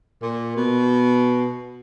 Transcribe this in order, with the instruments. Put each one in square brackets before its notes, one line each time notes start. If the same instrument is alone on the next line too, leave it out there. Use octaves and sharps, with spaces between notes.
[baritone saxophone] A#2
B2